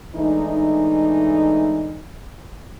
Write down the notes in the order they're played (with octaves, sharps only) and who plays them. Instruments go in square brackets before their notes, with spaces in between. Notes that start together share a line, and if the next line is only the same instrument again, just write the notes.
[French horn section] E3 G#3 A3 D4 D#4